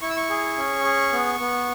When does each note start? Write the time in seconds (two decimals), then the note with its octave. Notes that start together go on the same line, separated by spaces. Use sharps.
0.02 E4 C#6
0.10 E6
0.17 C#6
0.30 G#4
0.57 C#4
0.84 G#4
1.12 B3
1.40 B3